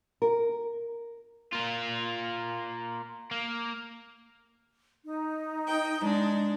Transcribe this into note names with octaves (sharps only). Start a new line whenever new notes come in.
A#4
A#3 F4
A#3
D#4
G5
G#3 D4